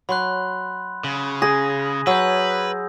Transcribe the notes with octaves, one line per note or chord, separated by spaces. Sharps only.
F#3 B5 C6 F#6
C#3
G#4 A#6
F#3 B4 E6 G6